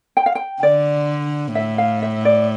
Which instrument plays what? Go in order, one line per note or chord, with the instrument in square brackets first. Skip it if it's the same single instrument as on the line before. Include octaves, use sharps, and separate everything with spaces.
[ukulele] G5
F5
G5
[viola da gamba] D3 [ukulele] D5
[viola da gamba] A2 [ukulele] E5
[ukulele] F5
E5
D5